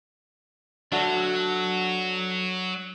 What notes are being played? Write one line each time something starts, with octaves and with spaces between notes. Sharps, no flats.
F#3 D4 F#4 A4